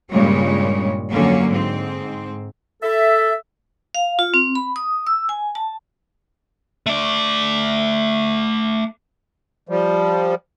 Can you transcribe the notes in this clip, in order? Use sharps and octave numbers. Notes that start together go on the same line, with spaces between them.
G2 A#2 C#3 G3 G#3 C#5
F2 D3 F#3 A#3 C#4
G#2 C4
A4 E5
F5
F4
C4
B5
D#6
E6
G#5
A5
A3 D5
F3 G3